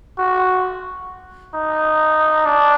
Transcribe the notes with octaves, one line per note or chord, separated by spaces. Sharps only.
F#4
D#4
D4